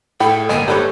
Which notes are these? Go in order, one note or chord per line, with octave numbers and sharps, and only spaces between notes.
A2 G#4 A4 G5 B5
G1 G#3 A#3 B3 G#5
D4 G4 A4 B4 C#5